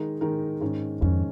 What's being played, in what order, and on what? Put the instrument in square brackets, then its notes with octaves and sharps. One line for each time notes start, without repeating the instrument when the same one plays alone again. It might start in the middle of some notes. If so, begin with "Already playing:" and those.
Already playing: [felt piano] D#3 G#3 D#4 A#4
D#3 G#3 D#4 A#4
G#2 D#3 C#4
[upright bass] F2 [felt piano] G#2 D#3 C#4